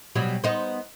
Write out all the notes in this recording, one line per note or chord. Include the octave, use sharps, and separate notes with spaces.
B2 F#3 G3
B3 D#4 C5